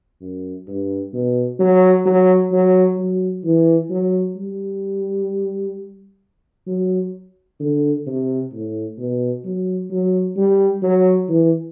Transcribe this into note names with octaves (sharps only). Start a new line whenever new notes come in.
F#2
G2
B2
F#3
F#3
F#3
F#3
E3
F#3
G3
F#3
D3
C3
A2
B2
F#3
F#3
G3
F#3
E3